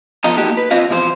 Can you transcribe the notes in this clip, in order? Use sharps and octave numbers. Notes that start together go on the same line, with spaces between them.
F3 B3 F4 A4 D#5 A#5
A#3 D#4 F#4 G4 A4
B4
C4 F4 C5 D#5 F5
E2 B2 F3 E4 C5